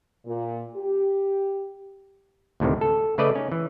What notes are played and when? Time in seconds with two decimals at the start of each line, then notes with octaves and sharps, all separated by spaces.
0.25 A#2
0.75 G4
2.60 D2 A2 C3 D#3
2.81 A4
3.18 C#3 A3 B4 D5 D#5
3.35 C#4 D#4
3.52 E3